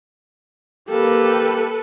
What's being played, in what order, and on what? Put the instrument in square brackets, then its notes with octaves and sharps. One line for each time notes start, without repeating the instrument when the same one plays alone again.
[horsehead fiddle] A#3 G4 [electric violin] A4 B4